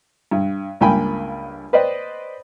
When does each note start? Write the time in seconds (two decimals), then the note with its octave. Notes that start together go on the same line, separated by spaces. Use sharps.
0.31 G2
0.81 C#2 G2 A#3 G5 G#5 B5
1.73 B4 C5 D5 D#5 G5